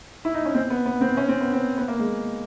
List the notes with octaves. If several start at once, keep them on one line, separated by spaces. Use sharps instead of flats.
E4
D#4
C#4
C4
B3
B3
C4
C#4
C4
B3
C4
B3
A#3
G#3